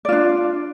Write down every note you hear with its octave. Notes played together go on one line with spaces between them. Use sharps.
D4 F4 D5